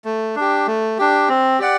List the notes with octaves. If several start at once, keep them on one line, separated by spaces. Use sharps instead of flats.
A3
D4 G4
A3
D4 G4
C4
G4 D5 F#5